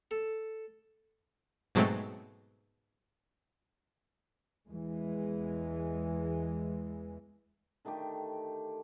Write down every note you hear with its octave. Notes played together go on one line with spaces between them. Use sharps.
A4
G#2 B2 F#3 G#3 A3 C4
E2 E3 G#3
D3 D#3 A3 G4